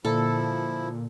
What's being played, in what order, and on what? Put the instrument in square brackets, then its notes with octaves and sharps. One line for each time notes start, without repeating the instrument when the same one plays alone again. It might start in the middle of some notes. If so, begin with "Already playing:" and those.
[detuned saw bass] A#2 [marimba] D3 A#3 [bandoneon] F3 E4 [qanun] A4